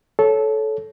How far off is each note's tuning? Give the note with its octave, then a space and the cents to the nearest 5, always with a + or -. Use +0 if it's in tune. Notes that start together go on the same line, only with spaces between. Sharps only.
A4 -15 C#5 +0